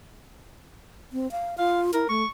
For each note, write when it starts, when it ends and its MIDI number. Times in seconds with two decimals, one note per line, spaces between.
1.13 1.30 60
1.32 1.55 77
1.58 1.91 65
1.58 1.80 77
1.94 2.06 64
1.94 2.05 70
2.09 2.23 57
2.09 2.29 85